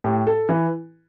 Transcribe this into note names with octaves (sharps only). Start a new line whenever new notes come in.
A2 G4
A4
E3 B4